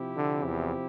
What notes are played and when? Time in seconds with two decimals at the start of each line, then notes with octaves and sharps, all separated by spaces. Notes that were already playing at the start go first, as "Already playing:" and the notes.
Already playing: C3 F3 C4 E4 G4
0.16 D3
0.46 E2